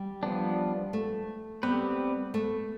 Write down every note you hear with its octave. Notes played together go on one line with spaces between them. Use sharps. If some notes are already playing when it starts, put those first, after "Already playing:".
Already playing: G3
F3 B3 D4
A3
G3 B3 C4 G4 B4
A3